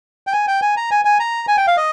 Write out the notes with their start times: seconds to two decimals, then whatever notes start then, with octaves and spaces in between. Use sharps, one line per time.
0.27 G5
0.33 G#5
0.47 G5
0.62 G#5
0.77 A#5
0.91 G#5
1.05 G#5
1.20 A#5
1.48 G#5
1.57 G5
1.67 F5
1.77 D#5